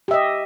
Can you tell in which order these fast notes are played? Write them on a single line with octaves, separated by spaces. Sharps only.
G4 E5 D#5